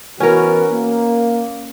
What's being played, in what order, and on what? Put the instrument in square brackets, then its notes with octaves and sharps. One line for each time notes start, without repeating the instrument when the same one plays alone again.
[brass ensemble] E3 B3 F#4 [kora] C#4 A#4
[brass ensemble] A#3